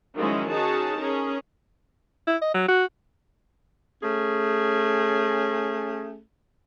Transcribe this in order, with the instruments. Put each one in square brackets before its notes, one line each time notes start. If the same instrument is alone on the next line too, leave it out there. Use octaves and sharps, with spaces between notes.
[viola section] D#3 F3 F#3 G#3 C#4 E4
C#4 D#4 F#4 G#4 A5
C#4 G#4 A#4
[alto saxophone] E4
D#5
F#3
F#4
[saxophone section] A3 C#4 G#4